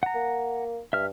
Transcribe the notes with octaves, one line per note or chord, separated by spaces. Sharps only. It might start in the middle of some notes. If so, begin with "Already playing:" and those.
F#5 A#5
A#3
G2 E5 F6